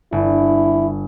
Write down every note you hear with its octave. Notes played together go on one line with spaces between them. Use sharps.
G1 E4